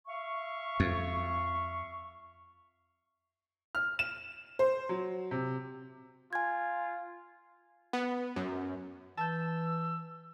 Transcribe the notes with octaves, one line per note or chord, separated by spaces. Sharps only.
E5 F5 C#6
F2
F6
E7
C5
F#3
C3
F4 G#5 G#6
B3
F#2
E3 A5 E6 G6